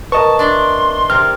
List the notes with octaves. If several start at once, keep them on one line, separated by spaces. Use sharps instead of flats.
A#4 B4 D#5 A5 C#6
D4 D5 E5 C6
C3 A#4 F6